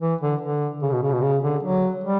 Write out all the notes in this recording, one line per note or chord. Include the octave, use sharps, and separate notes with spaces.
E3
D3
D3
C#3
B2
C#3
B2
C#3
D3
F#3
G3